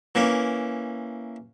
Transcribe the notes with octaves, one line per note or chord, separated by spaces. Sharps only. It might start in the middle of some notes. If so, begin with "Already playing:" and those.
E3 A#3 C#4